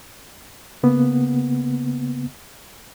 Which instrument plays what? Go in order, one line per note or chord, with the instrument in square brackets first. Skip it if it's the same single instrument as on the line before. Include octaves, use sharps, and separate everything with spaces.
[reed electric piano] C#3 A#3 B3